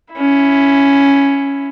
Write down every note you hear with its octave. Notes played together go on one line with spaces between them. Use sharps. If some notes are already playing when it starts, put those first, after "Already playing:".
C#4 E4